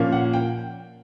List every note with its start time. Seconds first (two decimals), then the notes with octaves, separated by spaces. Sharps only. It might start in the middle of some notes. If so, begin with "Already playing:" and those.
Already playing: A#2 F3 A#3 C#4
0.12 F#5
0.33 G5